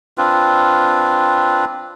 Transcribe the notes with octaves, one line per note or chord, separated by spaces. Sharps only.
C4 D4 F4 B4